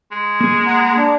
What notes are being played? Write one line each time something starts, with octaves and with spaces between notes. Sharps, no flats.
G#3
A#3 G#4
F#5 A#5
D4